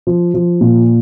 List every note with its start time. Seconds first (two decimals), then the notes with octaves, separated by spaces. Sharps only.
0.07 F3
0.34 F3
0.61 A#2